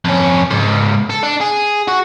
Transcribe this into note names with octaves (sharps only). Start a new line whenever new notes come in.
F2 C#4
C#2 G#2
A4
D4
G#4
F#4